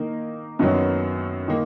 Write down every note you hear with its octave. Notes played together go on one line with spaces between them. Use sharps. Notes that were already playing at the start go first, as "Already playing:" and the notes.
Already playing: D#3 A#3 D#4 A#4
F#2 D#3 F#3 B3
D#3 A#3